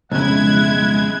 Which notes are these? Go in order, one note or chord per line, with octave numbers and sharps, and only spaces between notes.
B1 F2 C#3 G#3 E4 F#5 G#6